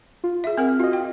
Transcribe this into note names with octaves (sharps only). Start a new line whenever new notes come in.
F4
G#4 E5
C4 A#4 F#5 F6
F4 F#4 D#5
G5